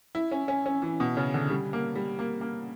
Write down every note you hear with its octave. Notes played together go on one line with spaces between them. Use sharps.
E4
C#4
C#4
C#4
E3
B2
C#3
D3
G3
A#3
G3
A#3
A#3